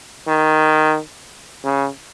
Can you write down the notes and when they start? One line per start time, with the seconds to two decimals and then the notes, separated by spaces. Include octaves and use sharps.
0.28 D#3
1.64 C#3